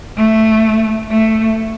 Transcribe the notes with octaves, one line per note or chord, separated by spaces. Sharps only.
A3
A3